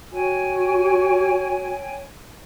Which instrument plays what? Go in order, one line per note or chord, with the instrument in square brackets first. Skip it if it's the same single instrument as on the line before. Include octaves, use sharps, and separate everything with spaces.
[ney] F#4 [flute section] C#5 G5 G#5